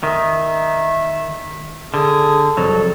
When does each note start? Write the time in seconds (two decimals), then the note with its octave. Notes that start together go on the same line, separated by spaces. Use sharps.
0.03 D#3 E5
1.94 D3 G#4
2.57 C2 F2 F#3 A4